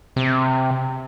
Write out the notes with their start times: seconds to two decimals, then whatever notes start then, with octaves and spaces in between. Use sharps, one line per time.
0.16 C3